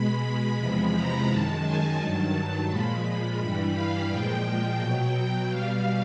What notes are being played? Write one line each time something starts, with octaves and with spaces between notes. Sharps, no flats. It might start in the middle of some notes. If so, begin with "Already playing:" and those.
Already playing: B2 G#3 B5
E2 C3 F3 G#3
A#5
F#2 D#3 G#3 A5
G#5
G2 D#3 F#3 A5
A#2 F3 G#3 B5
G2 E3 G3
F5
A#2 F3 G#3 G5
B2 F#3 G5
B2 G3 F5